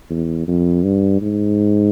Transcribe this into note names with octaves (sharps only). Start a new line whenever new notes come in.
E2
F2
G2
G#2